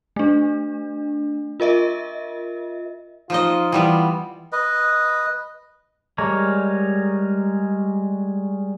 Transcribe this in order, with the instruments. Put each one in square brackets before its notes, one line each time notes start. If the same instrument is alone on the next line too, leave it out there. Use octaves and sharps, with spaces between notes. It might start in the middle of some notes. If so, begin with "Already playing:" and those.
[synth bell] A3 D4
F4 A#4 D#5 E5
[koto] F3 D#4 D#5 [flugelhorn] F4
[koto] E3 G3 B3
[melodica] B4 D#5
[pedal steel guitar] G3 G#3 A#4 C#5